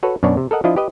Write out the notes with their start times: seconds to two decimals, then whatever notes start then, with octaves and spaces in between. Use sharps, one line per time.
0.03 F#4 A4 B4 C#5
0.23 F#2 B2 D4 C#5 D5
0.37 C3
0.51 A4 A#4 D#5 F#5
0.64 F3 D4 E4 F4 D#5
0.76 G4 B4 D#5